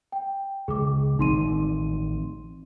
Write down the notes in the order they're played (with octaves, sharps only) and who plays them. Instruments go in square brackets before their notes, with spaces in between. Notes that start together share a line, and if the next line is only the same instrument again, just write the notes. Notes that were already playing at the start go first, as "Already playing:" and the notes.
[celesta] G5
[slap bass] C#2 [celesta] G#4 D6
[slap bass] A1 D#3 C4 [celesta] D#4 C6 D#7